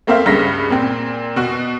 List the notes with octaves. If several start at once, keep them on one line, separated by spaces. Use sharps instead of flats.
A3 A#3 C4 C5 E5 F5
C#2 G2 C#3 A#6 B6
A#2 C4
B2 F#4